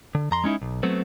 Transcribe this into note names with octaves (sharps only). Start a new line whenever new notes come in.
D3
F2 A#5 C6
G#3 C#4 D#4 E4
B1
F#3 A3 B3 C4